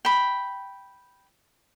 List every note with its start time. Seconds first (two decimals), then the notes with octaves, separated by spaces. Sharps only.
0.05 G5 B5